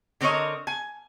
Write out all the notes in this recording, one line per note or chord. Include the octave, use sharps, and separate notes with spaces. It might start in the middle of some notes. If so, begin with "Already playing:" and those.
D3 C4 A#4 C#5 D#5
G#5